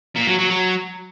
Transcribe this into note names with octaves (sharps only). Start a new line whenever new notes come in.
A#2
F#3
F#3
F#3